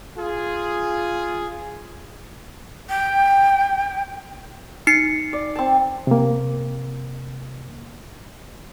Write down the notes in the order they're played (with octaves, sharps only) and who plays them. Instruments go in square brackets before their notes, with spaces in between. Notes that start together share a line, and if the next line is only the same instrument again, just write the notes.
[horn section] F4 G#4
[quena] G5
[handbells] D#4 C7 C#7
[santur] D5
C4 A5
[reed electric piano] C3 A#3